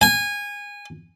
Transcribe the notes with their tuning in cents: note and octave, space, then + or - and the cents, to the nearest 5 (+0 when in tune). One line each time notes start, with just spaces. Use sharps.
G#5 -20